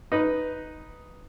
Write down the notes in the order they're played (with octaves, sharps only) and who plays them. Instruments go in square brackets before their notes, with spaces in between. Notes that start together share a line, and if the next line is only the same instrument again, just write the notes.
[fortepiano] D#4 B4